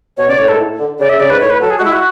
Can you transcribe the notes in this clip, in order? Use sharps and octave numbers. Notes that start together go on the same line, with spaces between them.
B2 C#5
C#3 D5
A2 C#5
G#2 A4
A2
D3
C#3 D5
E5
C#3 D5
G#2 B4
A2 C#5
B4
F#3 A4
G#4
F#4
G#3
E4
F#4